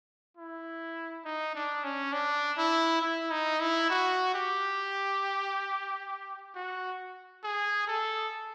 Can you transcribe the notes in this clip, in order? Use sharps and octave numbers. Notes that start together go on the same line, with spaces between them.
E4
D#4
D4
C#4
D4
E4
E4
D#4
E4
F#4
G4
F#4
G#4
A4